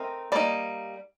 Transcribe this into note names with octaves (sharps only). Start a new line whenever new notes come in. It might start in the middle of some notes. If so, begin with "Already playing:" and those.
Already playing: A3 C4 D#4 A#4
G3 A#3 D#4 D5